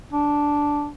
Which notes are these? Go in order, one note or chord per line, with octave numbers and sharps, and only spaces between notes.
D4